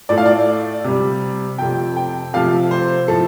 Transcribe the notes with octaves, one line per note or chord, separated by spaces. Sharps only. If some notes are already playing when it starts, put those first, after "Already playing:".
A2 A3 D5
F5
D5
C3 G3
F2 C3 A3 G5
G5
C3 F3 A3 F5
C5
A2 F3 A3 A4